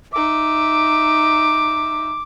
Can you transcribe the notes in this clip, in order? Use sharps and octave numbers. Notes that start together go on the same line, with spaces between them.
D#4 E5 D6